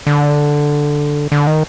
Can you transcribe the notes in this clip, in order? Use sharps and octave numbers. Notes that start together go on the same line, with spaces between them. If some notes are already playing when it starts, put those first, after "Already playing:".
D3
D3
D#3